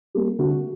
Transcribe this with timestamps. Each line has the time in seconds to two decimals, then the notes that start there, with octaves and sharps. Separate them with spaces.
0.15 G3 A#3
0.39 D3 F#4